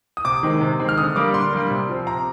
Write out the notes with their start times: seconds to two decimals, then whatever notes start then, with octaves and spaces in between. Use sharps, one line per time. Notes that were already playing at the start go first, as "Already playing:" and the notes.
0.17 D#6
0.25 C3 D6
0.43 D#3 G#3 C4
0.61 C3
0.79 D#3 G#3 C4
0.89 F6
0.98 D3 D#6
1.16 G3 A#3 D6
1.34 D3 C6
1.53 G3 A#3
1.70 C3
1.89 F3 C4
2.07 C3 A#5